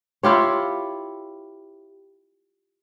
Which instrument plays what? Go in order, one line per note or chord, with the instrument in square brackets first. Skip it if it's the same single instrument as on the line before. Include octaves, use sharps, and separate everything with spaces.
[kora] E4 F4 G4 C#5